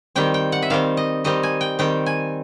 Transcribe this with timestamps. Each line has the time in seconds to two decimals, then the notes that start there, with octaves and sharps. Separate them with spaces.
0.15 D#3 G3 C4 G5
0.34 G5
0.52 F#5
0.62 E5
0.70 D#3 G3 C4 F5
0.97 D#5
1.24 D#3 G3 C4 D#5
1.43 G#5
1.61 G5
1.79 D#3 G3 C4 G5
2.06 G#5